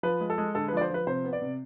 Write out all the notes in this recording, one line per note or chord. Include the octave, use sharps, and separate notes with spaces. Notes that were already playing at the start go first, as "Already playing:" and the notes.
F3 B4
G#3
A4
G#3
D3 A4
B4
F3 D5
C5
F3 B4
C3 C5
B3
D5
C3